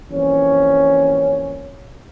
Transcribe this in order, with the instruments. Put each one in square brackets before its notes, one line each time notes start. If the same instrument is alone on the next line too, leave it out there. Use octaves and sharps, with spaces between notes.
[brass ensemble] F2 E3 G3 A#3 C#4